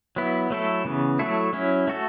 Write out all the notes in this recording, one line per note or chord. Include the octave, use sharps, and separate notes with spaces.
F#3 B3 E4
F#3 A3 E4 A4
C#3 E3 B3
F#3 A3 E4 A4
F#3 C#4 E4
A3 F#4 A4